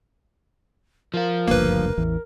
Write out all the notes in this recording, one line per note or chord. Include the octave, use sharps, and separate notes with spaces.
F3 F4 A#4
F#1 D2 G2 A#3 B4
A1 E2 E3